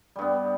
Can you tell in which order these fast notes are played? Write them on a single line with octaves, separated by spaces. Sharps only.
G3 G2 B3